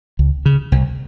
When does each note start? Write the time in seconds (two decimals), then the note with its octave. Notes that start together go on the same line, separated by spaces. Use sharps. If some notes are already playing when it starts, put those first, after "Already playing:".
0.19 C#2
0.46 C#3
0.72 C2